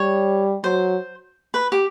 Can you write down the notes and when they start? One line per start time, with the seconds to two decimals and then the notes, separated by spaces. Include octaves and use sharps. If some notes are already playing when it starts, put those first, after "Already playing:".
Already playing: G3 C#5
0.64 F#3 C5
1.54 B4
1.72 G4